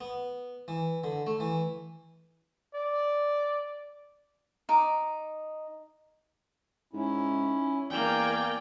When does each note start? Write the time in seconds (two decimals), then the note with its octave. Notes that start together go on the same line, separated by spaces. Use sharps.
0.01 B3
0.68 E3
1.04 D3
1.27 A3
1.40 E3
2.75 D5
4.69 D#4 D6
6.93 G#2 C#4 E4
7.90 E2 A#3 D5 G5 G#5